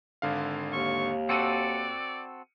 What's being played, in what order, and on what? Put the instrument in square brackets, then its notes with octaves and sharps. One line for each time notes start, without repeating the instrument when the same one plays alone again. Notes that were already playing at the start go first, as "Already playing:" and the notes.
[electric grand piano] G#1 D3 F5
[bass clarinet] D#2 [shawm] C#6
[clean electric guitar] C4 F#4 A4 [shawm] D5 [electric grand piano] C#7 D#7